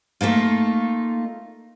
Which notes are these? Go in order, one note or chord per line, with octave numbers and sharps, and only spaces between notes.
A3 A#3 D#4 F4